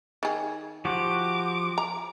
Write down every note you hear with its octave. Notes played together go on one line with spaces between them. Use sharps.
D#3 G#4
F3 F#4 G4 D6
A#5